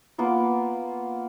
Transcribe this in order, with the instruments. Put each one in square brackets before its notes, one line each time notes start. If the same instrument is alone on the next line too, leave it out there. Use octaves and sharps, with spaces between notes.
[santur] A#3 B3 F4